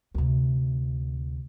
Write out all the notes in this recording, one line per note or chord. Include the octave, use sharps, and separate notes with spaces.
D2 C3